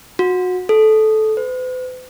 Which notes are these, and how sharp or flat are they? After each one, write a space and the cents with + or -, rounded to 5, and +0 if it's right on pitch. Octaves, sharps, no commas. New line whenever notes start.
F#4 -25
A4 -15
B4 +45